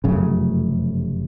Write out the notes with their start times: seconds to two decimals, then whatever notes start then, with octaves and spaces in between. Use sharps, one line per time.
0.04 F1 F#2 C#3